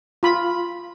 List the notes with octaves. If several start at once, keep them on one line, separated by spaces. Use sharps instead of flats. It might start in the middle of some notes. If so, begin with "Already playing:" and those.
F4 B5